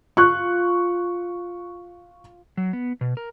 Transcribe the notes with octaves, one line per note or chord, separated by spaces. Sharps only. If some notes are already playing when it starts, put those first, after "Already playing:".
F4 C#6 F#6
F#3
B3
B2
A#4